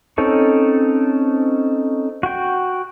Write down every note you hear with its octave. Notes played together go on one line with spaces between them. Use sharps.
C4 C#4 D#4 A4 C#5
F#4 G5